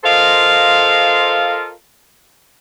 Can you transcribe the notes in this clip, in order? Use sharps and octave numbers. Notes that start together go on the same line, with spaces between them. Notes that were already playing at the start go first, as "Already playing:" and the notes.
F4 A4 A#4 C5 D#5 F5